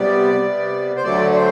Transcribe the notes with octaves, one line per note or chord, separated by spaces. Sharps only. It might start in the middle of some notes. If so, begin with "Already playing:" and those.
Already playing: C3 G3 B3 D5
C3 G3 B3
C5
D2 D3 F#3 A3 D5
D5
C5